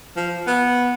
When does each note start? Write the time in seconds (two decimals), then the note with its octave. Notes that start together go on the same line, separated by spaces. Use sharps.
0.17 F3
0.47 B3